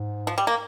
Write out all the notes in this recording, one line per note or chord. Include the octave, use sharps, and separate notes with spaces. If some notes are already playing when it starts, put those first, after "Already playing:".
Already playing: G#2
F3
G3
A#3